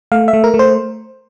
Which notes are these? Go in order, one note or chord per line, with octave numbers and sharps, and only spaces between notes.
A3 F5
E5
A3
A#4
A3
C5